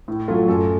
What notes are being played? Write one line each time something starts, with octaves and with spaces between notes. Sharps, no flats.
A2
F#3 A3 F4
F#2 A4